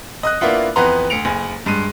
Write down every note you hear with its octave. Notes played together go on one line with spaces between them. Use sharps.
D#5 D#6 F#6
A#3 B3 D4 E4 F4 F#5
F2 E3 B3 B4 A#5 C6
D2 C#7 D7 F7
F#1 G#5
G2 G#3 D#7